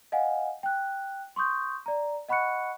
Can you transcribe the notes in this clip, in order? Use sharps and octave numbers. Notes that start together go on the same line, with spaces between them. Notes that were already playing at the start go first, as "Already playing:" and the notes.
D#5 F5 F#5 G#5
G5 F#6
C6 C#6 D#6 G6
D5 A#5
D#5 F#5 B5 C#6 F#6 C#7